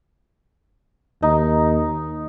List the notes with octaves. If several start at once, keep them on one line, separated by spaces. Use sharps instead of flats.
D#2 D#4